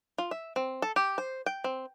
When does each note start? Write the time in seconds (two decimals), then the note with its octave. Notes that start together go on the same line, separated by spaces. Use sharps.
0.18 F4
0.31 E5
0.56 C4
0.82 A4
0.96 G4
1.18 C5
1.46 G5
1.64 C4